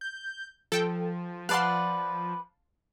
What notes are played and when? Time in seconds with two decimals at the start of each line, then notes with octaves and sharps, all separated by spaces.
0.01 G6
0.72 F3 A4 G5
1.49 B4 D5 F5 F#5 A5 C6